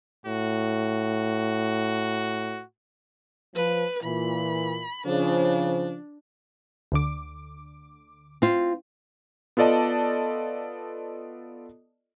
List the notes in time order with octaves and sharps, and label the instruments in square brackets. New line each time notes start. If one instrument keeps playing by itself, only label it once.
[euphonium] A2 [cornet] F#4
[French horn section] F3 [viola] B4
[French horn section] A#2 E3 [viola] B5
[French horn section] C#3 F3 C5 [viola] D4
[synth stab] D2 D3 D6
[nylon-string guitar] C4 F4
[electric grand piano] B3 F4 A4 D5 D#5 A5